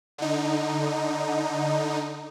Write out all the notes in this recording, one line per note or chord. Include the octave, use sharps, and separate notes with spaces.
D3 D#4